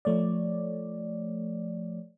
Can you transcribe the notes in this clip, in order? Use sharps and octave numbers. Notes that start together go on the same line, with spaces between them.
F3 A3 C#5 D5